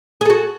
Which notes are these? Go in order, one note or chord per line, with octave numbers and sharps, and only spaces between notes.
F#4 G#4 A4